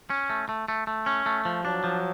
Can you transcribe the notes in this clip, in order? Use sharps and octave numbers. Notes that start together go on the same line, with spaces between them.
C#4
A3
A3
A3
A3
C#4
A3
F3
F#3 D4
F3